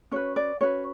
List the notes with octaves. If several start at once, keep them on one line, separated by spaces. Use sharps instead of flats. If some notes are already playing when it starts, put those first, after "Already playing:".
C#4 F#4 B4 C#5
D5
C#4 F#4 B4 C#5